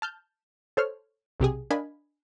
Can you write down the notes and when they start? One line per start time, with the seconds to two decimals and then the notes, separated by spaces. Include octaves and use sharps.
0.02 A5 F6 G6
0.77 A4 C5 C#5 F6
1.40 B1 C3 G4 G#4
1.71 D4 A#4 D#5 F5 G#5 B5